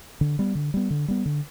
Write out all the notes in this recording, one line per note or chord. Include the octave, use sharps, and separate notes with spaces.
D3
G3 B3
D3
G3 B3
D3
G3 B3
D3